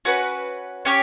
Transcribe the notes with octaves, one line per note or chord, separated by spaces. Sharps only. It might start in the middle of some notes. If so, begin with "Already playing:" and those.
C#4 F#4 B4
C#4 G4 C#5